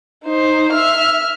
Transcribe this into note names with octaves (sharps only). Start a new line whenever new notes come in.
D#4 C5
E5 F6